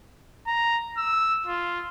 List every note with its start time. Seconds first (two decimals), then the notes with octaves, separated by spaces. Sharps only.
0.47 A#5
0.98 E6
1.47 F4